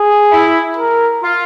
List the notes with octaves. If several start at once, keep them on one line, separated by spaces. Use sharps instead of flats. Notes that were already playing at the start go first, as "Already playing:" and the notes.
Already playing: G#4
E4
A#4
F4